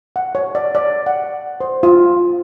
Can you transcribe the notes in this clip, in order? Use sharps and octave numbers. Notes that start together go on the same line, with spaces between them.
F#5
C#5
D5
D5
F#5
C5
F4